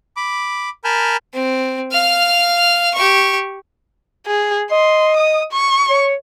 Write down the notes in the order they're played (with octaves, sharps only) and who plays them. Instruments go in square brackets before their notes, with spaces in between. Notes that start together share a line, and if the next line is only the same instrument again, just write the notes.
[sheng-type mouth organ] B5 D6
A#4 G#5 A5 B5 F6 G6
[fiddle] C4
F5 F6
G4 C#6
[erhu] G#4
[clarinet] D#5 [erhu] C6
[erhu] D#6
C#6
[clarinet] C#5